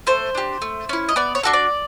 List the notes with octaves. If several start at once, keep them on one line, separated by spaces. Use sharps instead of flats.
A3 C5
D4 G4
A3
C#4 E4
D#5
B3 D5
C#5
D4 F#4 A4
D5